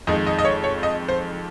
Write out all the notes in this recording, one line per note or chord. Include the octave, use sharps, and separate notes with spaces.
F2 D#3 G#3 D#5
D#5
D#5
C#5
C#5
D#5
C5